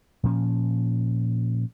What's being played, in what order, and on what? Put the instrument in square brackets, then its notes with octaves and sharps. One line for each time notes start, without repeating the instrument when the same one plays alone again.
[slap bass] A#2 F3 C#4